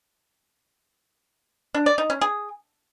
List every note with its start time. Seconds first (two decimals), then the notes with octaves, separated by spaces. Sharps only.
1.74 D4
1.86 D5
1.98 D#4
2.10 C#4
2.21 G#4